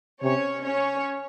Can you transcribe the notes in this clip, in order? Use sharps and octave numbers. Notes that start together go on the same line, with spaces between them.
C3 C#4 C#5
C#4 C#5